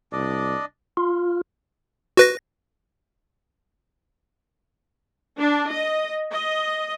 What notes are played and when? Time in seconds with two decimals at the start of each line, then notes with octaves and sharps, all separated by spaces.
0.12 C2 D4 D5 D#5
0.97 F4
2.17 F#4 B4 A#6
5.40 D4
5.71 D#5
6.31 D#5